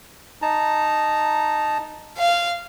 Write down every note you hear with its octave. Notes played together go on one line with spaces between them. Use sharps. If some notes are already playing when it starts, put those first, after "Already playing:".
D#4 A5 A#5
F5